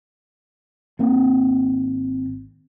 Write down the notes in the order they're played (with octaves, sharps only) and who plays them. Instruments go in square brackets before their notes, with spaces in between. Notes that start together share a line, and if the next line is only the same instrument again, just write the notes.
[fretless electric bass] G#1 A#3 C4